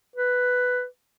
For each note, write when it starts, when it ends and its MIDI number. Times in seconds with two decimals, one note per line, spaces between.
0.16 0.85 71